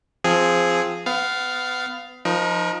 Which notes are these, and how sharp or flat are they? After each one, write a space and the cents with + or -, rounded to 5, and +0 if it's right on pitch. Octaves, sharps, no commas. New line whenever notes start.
F3 -5 C4 +0 G#4 +0
B3 +30 F5 +0
F3 +0 D#4 +0 A#4 +40